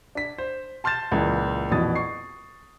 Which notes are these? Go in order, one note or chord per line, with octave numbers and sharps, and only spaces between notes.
D4 B6
C5
A5 C6 F6 G6 A6 E7
C#2 A#2 E3 A#3
A#1 F2 B2 E3 D#6 A6
C#6 C7